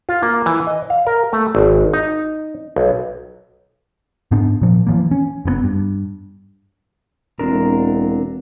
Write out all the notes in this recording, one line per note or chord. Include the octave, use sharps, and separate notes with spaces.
F4
A#3
E3
D#5
F5
A#4
A3
G#1
D#4
B1
G#2 B3 D4
A#2 F3
E3 F3 A#3
C#4
F#1 C#3 B3
G2
E1 C4 D4 A#4